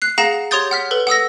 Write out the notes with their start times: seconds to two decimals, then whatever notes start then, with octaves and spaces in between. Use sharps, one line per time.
0.02 F#6 C7
0.18 G#4 F5 F#5 A#5 A#6 E7
0.51 G4 C#5 C6 D#6 G6 A6
0.71 F#5 F6 B6
0.91 A4 B4 G7
1.07 F#5 D#6 E6 A#6